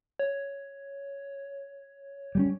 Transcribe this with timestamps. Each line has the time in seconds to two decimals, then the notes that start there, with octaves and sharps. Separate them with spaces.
0.19 C#5
2.35 G3 G#3 C#4